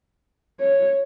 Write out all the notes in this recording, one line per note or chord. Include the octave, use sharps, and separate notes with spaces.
C#5